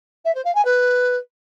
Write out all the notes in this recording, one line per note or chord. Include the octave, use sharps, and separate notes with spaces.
E5
C5
F5
G#5
B4